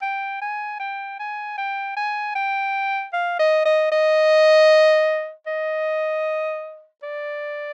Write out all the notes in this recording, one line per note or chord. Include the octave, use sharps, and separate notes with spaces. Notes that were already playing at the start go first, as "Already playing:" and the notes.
G5
G#5
G5
G#5
G5
G#5
G5
F5
D#5
D#5
D#5
D#5
D5